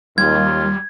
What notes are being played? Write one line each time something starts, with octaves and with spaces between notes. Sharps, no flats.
D#2 G3 F4 G#6